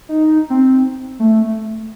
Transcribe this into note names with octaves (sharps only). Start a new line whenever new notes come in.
D#4
C4
A3